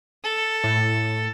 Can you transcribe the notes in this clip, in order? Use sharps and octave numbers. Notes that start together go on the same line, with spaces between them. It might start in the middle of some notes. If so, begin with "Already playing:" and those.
A4
A2